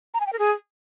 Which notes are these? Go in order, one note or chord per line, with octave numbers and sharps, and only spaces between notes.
A#5
G#5
G5
A#4
G#4